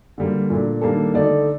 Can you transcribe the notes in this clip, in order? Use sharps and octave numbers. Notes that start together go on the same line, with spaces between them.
D3 G3 A#3
A#2 A3 D4
D#3 G3 A#3 D4 A4
D3 A3 D#4 A4 D5